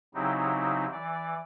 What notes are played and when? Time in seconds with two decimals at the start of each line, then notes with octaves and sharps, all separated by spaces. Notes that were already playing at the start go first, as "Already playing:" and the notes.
0.14 C#3 F#3 C4 D#4 E4 G4
0.92 E3 D5